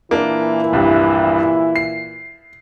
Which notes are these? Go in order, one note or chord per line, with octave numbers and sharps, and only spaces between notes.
A#2 E3 A#3 D4 E4
F1 C2 G2
C7